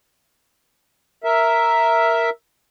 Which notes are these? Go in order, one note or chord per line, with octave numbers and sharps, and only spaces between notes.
A#4 E5